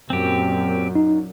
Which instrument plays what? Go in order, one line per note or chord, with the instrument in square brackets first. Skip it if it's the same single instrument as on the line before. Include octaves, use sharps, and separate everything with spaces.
[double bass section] F#2 A#2 [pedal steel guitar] C4 G4
[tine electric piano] D#4